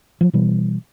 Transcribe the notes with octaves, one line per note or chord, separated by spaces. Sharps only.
F3 F#3
B2 E3 G3